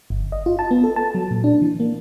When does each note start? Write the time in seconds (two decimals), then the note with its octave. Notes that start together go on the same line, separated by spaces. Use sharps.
0.10 G1
0.32 D#5
0.46 F4
0.59 A5
0.71 B3
0.84 A4
0.96 A5
1.15 F#3
1.31 A#2
1.44 D4
1.62 E3
1.80 A#3